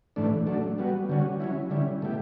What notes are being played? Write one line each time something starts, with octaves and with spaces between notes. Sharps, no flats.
A2 E3 A3 D4
F#3 A3 D4
G3 B3 F#4
D3 G3 C#4 F#4
F#3 C#4 E4
D3 G3 C#4 E4
B2 A3 E4 G4